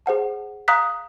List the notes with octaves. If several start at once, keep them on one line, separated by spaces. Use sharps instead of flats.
G#4 C5 F#5 A5
F5 A#5 D#6 F#6 B6